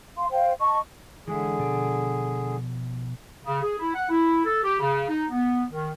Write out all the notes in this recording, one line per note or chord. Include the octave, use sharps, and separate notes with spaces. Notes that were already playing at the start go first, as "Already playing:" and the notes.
F5 C6
C5 F5 G5
D#5 A5 C#6
D3 E3 G#3 G#4 E5
B2 F3 D5
C#3
G#4
E4
F#5
E4
A4
G4
C#3
D#4
B3
D#3